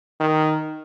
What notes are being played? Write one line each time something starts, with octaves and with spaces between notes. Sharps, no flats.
D#3